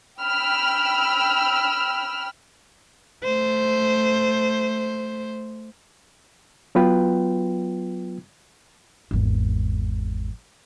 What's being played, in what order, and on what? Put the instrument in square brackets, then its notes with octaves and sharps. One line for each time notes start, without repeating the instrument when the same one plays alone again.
[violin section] G5 B5 E6 F6
[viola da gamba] A3 C5
[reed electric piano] F#3 B3 F4 B4 G5
[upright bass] G#1 E2